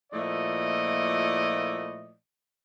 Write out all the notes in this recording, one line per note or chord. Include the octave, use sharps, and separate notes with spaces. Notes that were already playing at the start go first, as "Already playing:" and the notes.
A#2 F3 A3 E4 D5 D#5